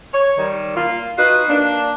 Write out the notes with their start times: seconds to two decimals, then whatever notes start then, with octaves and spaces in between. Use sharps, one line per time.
0.14 C#5
0.38 D#3 G3
0.76 A#3 F4
1.18 D#4 F4 F#4 B4
1.48 A#3 D4